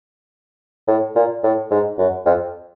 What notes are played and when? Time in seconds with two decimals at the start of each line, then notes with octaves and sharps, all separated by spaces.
0.87 A2
1.15 A#2
1.43 A2
1.71 G#2
1.98 F#2
2.26 F2